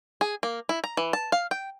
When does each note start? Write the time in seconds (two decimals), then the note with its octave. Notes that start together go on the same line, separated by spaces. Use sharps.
0.21 G#4
0.43 A#3
0.69 E4
0.84 A#5
0.97 E3
1.13 A5
1.32 F5
1.51 G5